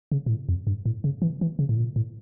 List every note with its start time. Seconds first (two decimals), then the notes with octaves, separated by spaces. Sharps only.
0.12 C#3
0.26 A#2
0.29 A2
0.49 F2
0.67 G2
0.86 A2
1.04 C#3
1.22 E3
1.41 E3
1.59 C#3
1.69 A2
1.77 A#2
1.96 A2